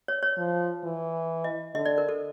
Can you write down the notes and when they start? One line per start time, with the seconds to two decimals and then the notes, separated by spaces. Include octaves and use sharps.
0.08 C#5
0.23 C#5
0.38 F3
0.83 E3
1.44 D#5
1.74 D3 D#5
1.86 D5
1.98 A#4
2.09 A4